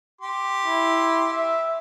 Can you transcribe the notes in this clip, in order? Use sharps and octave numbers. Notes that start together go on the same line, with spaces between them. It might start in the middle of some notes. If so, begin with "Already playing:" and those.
G4 C6
E4
E5